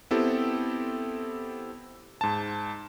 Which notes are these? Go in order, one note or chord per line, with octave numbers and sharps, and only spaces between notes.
B3 C4 E4 G4 A4
G#2 A5